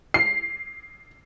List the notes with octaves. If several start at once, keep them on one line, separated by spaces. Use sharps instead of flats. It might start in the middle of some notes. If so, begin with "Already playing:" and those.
C7